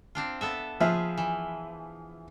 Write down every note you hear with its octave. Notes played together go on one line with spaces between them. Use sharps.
C4 D4 F4
B3 A4 E5
F3 F4 G#4 B4 E5
E3